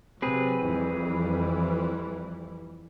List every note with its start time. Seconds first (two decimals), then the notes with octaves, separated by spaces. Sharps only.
0.22 C3 F#3 C4 G#4 B4
0.64 F2 E3 G3